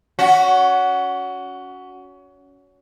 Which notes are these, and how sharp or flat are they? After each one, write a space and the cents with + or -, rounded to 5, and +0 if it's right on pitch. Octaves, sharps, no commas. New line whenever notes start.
C#4 +25 F#4 +0